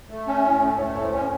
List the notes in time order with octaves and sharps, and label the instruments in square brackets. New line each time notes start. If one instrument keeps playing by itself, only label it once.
[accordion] A3
C#4
A2
A3
[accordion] A3 [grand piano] C#5
[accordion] A2 [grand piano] C#5
[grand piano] C5
[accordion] C#4